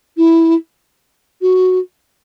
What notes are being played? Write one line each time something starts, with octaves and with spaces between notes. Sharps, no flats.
E4
F#4